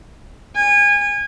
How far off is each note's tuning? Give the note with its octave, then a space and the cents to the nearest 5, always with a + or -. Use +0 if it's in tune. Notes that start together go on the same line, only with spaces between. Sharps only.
G#5 -25